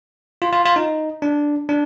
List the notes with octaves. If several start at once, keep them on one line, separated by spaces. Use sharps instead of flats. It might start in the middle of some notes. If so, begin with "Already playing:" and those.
F4
F4
F4
D#4
D4
D4